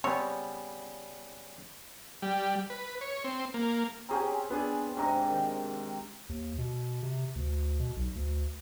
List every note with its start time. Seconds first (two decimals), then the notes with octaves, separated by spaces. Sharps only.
0.04 C#3 G3 B3 C4 C#5
2.22 G3
2.70 B4
3.01 C#5
3.24 C4
3.54 A#3
4.09 C4 C#4 G4 G#4 A#5
4.50 B3 D4 G#4
4.97 G#2 C3 D4 D#5 A#5
5.28 D#3
6.29 D#2
6.58 B2
7.03 C3
7.36 D2
7.80 B2
7.96 B1
8.15 D2